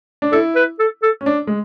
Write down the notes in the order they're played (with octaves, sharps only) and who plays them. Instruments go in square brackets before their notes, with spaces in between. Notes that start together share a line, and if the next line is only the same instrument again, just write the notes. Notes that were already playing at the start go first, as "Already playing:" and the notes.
[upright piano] D4
[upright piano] E4 [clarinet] A4
[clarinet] B4
A4
A4
[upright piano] C#4
D4
G#3